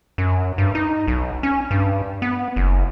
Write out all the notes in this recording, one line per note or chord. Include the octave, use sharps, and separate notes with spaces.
F#2
G2
D#4
B1
C#4
G2
B3
F#1